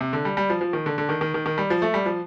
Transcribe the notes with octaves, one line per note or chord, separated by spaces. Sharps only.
C3
D3
G3
G3
F3
F3
D#3
D3
D3
D#3
D#3
D#3
D#3
G3
F3
A3
G3
F3